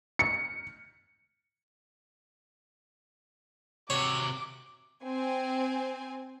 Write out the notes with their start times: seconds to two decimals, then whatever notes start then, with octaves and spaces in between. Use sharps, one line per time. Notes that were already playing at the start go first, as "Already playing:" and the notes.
0.19 C#7
3.90 C3 F#4 C#5 D6
5.04 C4 G#5